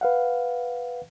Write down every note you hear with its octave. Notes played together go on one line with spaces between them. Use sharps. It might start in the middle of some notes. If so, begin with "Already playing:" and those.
B4 F5 F#5